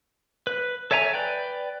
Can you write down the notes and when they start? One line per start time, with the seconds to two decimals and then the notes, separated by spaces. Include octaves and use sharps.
0.47 B4
0.91 A4 C#5 E5 G#5 A#5
1.14 B4 D5 G5